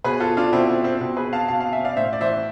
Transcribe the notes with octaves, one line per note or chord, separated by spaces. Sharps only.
B2 G#4 B4
F4 A4
D4 F4
B2 C4 E4
C4
C4
B2 C4
G#4 B4
F5 A5
B2 F5 A5
F5 A5
E5 G#5
D5 F5
A2 C5 E5
D5
E3 C5 E5